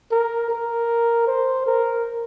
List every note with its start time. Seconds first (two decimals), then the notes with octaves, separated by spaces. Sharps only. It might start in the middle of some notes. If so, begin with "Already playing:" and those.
0.11 A#4
0.50 A#4
1.27 C5
1.66 A#4